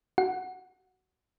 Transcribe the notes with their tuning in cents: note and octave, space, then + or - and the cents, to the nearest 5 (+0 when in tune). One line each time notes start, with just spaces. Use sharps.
F#4 +20 F#5 +0